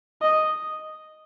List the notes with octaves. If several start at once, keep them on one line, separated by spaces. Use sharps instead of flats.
D#5